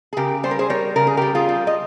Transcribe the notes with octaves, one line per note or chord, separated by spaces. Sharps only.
G#4
C#3 G4 A#4
G3 C5
A#4
G#4 C5
G3 A#4 C#5
C#3 A#4
G#4
G3 G4 A#4
F4 G#4
G3
D#5